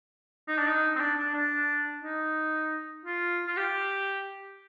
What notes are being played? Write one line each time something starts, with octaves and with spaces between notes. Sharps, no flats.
D#4
D4
D#4
C4
D4
D4
D4
D#4
F4
F4
G4